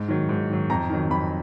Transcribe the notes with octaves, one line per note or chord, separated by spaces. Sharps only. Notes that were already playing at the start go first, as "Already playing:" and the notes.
Already playing: G#2
D#3 F#3
G#2
D#3 F#3
F2 A#5
D#3 F#3
F2 B5